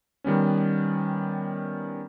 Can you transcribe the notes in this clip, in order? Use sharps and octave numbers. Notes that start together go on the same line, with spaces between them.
D#3 G3 B3 C#4